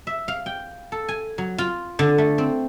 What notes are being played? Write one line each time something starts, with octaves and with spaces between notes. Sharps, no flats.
E5
F5
G5
A4
G#5
F#3
F4
D3
A3
C4